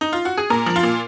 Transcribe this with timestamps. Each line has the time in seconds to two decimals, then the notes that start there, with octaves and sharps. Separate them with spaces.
0.01 D#4
0.13 F4
0.25 F#4
0.37 G#4
0.50 A#2 A#4
0.66 F3
0.76 F4
0.83 A#2